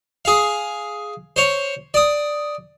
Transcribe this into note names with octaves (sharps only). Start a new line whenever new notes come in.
G#4 F5
C5 C#5
D5 D#6